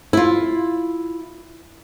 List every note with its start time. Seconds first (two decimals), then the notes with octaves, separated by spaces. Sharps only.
0.13 E4 F4